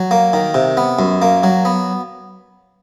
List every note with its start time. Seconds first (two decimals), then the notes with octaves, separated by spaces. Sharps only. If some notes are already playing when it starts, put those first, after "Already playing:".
Already playing: F#3
0.11 A#3
0.33 D#3
0.54 C3
0.77 B3
0.99 F#2
1.22 A#3
1.43 F#3
1.65 B3